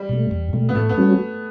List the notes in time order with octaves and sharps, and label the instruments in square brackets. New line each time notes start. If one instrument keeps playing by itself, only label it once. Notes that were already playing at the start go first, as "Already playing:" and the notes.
Already playing: [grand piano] G3
[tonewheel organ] B2 A3
E2
B2 A3
[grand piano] B3
[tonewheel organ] A2 [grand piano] A3
[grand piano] B3
[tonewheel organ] G3 C#4 F#4